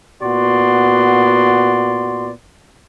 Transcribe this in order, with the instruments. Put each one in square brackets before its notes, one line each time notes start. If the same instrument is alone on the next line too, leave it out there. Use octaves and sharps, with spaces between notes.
[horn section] A#2 B3 F#4 D5 C6